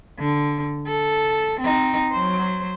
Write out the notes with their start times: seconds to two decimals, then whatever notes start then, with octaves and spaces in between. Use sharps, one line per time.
0.19 D3
0.87 A4
1.60 C4 D#4
2.12 F#3 C5